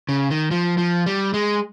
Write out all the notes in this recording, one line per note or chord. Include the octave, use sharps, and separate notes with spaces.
C#3
D#3
F3
F3
G3
G#3